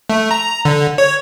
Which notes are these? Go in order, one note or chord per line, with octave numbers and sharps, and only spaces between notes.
A3
A#5
D3
C#5